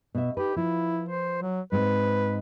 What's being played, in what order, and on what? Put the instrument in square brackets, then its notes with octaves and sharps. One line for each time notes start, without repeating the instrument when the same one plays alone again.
[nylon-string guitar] B2 E5
[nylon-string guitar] D#4 A4 B4 [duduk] G4
[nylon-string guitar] F3 F4 B4 [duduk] E4
[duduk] C5
F#3
[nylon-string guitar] G#2 G#3 C4 [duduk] B4